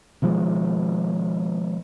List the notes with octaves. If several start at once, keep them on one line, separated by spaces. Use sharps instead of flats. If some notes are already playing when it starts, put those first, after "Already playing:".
B2 D#3 F3 G#3